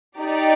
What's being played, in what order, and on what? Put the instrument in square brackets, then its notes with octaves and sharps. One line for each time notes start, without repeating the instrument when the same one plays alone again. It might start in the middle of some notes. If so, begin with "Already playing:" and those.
[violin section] D#4 G4 D5